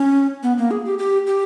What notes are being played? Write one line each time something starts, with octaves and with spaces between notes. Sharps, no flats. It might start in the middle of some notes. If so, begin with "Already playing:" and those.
Already playing: C#4
B3
A#3
G#4
G4
G4
G4